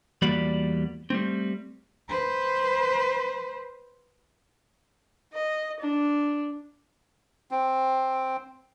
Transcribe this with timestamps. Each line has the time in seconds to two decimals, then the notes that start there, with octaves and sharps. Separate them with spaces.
0.22 E2 G3 A#3 F#4 D5 B5
1.10 G3 A3 C4
2.09 B4 C5
5.33 D#5
5.80 D4
7.51 C4